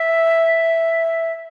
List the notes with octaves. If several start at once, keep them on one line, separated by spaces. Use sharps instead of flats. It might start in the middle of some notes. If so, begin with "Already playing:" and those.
Already playing: E5